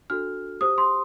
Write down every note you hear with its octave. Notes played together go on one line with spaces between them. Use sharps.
D4 F#4 A4 F6
G4 C5 D#6
C6